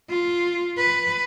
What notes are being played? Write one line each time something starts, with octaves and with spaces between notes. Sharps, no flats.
F4
B4